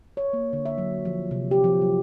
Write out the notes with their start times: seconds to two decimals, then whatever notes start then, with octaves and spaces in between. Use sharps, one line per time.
0.17 C#5
0.33 A#3
0.53 D3
0.66 E5
0.78 F#3
1.05 F3
1.31 C3
1.51 G4
1.64 F3
1.81 F#3